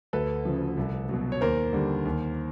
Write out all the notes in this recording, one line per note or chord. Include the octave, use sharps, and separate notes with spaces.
D2 A4 B4
C#3 F3
C2
B2 F#3
C#5
D#2 A#4 C5
D3 G3
D#2